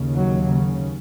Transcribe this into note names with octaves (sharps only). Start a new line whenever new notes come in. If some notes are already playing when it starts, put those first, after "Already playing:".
Already playing: D#2 C#3
F#3
C#3